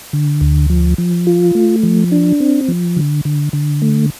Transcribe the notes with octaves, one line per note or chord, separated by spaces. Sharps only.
D3
D2
F3
F3
F4
A3
F3
D4
C4
F3
D3
D3
D3
A3